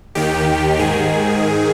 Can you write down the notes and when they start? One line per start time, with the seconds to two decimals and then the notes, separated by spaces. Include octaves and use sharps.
0.15 D#2 D#3 G4
0.79 G#2 D#3 G#4